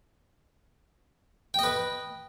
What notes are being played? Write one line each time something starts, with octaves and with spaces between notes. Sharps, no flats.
B4 D#5 G5